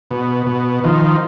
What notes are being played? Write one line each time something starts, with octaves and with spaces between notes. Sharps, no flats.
B2
B2
D#3 F3